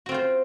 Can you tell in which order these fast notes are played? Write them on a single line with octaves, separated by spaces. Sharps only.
F#4 C4 F4 C5